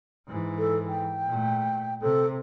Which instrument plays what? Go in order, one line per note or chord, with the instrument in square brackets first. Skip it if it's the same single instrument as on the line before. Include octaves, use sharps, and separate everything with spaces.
[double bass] G#2 E3
[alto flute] A4
G5
[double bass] A#2 A3
[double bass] C3 [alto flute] A4